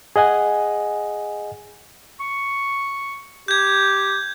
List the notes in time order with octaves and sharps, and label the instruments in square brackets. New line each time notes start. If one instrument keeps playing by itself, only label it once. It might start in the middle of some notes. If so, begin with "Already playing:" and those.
[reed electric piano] G#4 D#5 F#5 G#5
[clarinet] C#6
[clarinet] G4 [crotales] G6 G#6